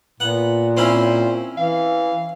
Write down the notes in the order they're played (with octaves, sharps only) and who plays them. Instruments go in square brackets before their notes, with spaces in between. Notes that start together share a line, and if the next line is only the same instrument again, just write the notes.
[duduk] A#2 [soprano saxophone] B3 [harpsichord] F#5
[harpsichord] C4 C#4 E4 [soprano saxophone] C5
[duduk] E3 [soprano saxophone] F5